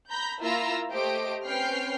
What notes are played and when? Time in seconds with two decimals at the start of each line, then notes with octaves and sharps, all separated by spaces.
0.10 A#5 B5 G6
0.41 A#3 E4 F4 A#5 E6
0.92 A3 G4 C5 D#5 D7
1.45 C4 C#4 B4 G5 F6 C7